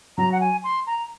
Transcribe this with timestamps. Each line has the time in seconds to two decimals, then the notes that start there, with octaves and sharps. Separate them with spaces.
0.18 F#3 A#5
0.32 F#5
0.41 G#5
0.64 C6
0.87 A#5